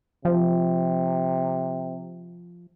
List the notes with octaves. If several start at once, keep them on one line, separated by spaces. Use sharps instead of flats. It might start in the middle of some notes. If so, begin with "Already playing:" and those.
C3 F3